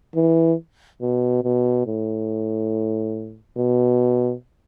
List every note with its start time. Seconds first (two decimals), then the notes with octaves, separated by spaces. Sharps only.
0.15 E3
1.01 B2
1.44 B2
1.86 A2
3.57 B2